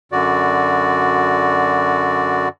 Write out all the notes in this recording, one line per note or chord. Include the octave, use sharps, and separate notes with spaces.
F#2 D3 F#4 D5